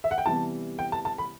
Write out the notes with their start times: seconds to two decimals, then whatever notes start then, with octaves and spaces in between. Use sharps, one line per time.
0.04 E5
0.11 F#5
0.18 G5
0.25 C3 E3 G3 B3 A5
0.79 G5
0.92 A5
1.05 A5
1.18 B5